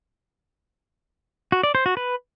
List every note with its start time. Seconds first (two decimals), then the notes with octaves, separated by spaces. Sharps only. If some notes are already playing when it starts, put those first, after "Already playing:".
1.52 F#4
1.63 D5
1.75 C5
1.86 F#4
1.97 B4